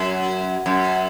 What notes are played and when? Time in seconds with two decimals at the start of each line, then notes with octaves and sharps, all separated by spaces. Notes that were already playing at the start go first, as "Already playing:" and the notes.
Already playing: F#2
0.66 F#2